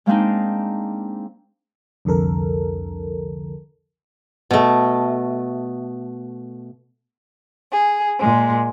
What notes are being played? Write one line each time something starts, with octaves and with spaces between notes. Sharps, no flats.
G#3 A#3 C4 D4 D#4
C2 F2 D3 A4 A#4
B2 A3
G#4
A#2 G#3